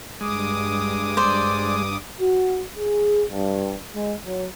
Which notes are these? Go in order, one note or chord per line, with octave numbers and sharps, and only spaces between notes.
G2 G#3 D6 D#6
C5 D5
F#4
G#4
G2
G#3
F#3